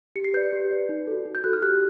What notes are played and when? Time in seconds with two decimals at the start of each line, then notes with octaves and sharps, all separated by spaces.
0.16 G4 C#7
0.24 C7
0.34 B4 D5 G6
0.53 G4
0.71 B4 D5
0.89 D#4
1.07 F#4 A4
1.26 D#4
1.35 G6
1.44 F#4 A4 F#6
1.53 F6
1.62 G4 F#6